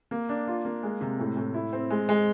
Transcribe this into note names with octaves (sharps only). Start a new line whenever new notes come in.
A#3
D4
F4
A#3
G#3
C3
A2
A2
E4
C4
G#3
G#3